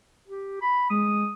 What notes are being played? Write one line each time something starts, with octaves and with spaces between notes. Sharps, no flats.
G4
B5
G#3 D#6